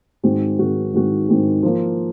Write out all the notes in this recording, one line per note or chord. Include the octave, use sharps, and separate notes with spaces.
G#2 D#3 G#3 C4 F#4
G#2 D#3 G#3 C4 F#4
G#2 D#3 G#3 C4 F#4
G#2 D#3 G#3 C4 F#4
F3 A#3 F4